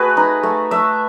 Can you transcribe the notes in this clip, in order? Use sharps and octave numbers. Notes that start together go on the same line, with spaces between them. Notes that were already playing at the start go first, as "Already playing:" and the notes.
Already playing: A3 F#4 G#4 B4
D#4
A3
A3 E5